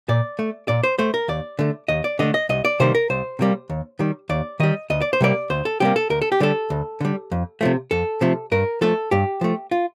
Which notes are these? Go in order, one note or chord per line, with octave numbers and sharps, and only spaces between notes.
A#2 D5
A3
A#2 D5
C5
A3 C5
A#4
D#2 D5
D3 A3
D#2 D#5
D5
D3 A3 D#5
D#5
C2 D#5
D5
C3 D#3 G3 A#3 C5
A#4
C2 C5
C3 D#3 G3 A#3
D#2
D#3 G3
D#2 D5
D#3 G3 D#5
D2 D#5
D5
C5
C3 G3 A#3 D5
D2 C5
A4
C3 G3 A#3 G4
A4
D2 A#4
A4
G4
D3 G3 A4
D2
D3 G3
F2
C3 F3 A3
F2 A4
C3 F3 A3
G2 A#4
F3 A3 A4
G2 G4
F3 A3
F4